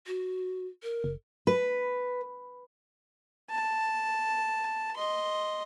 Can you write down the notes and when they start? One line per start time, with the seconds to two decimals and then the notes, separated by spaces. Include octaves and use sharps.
0.07 F#4
0.83 A#4
1.04 F#1
1.47 B4
3.50 A5
4.96 D#5 C6